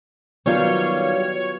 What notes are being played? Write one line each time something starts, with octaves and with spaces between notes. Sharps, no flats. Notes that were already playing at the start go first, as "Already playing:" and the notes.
D#3 F#3 G3 B3 F4 C#5 F5